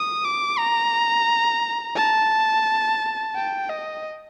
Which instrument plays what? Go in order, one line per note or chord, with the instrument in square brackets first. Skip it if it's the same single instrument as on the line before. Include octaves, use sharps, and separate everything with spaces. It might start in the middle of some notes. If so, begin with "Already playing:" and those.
Already playing: [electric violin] D#6
D6
A#5
A5
G5
D#5